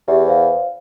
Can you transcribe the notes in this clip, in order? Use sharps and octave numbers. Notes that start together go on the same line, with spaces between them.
E2 G4 E5
C5 F5